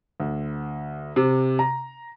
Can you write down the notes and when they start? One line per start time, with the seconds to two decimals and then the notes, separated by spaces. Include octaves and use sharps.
0.20 D2
1.16 C3
1.59 A#5